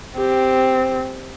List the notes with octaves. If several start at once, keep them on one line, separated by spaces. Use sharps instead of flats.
C4 G4